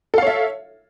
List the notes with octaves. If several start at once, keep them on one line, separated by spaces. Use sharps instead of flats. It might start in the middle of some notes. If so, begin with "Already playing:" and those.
A4 C#5 E5 F5